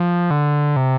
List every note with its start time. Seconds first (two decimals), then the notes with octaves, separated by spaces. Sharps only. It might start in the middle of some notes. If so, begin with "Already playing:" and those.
Already playing: F3
0.31 D3
0.76 C3